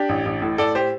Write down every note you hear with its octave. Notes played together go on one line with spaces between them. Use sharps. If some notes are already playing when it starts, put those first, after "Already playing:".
Already playing: D4 G4
A1
A1
A2
A2 A4 D5
G4 C5